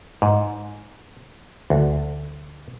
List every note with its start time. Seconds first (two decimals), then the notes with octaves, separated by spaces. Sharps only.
0.22 G#2
1.70 D2